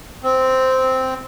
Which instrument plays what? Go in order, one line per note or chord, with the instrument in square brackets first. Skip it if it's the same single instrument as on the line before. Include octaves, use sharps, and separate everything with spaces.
[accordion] C4